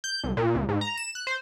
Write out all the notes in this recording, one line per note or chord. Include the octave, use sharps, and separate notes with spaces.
G6
C2
A#2
C#2
G#2
A#5
E7
F#6
C5